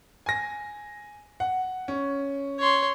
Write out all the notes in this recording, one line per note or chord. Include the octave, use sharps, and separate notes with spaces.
G#5 A#6
F#5
C#4
C#5 C6